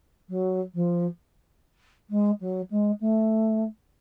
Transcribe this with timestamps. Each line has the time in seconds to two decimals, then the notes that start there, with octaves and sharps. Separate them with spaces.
0.29 F#3
0.74 F3
2.10 G#3
2.41 F#3
2.70 G#3
3.00 A3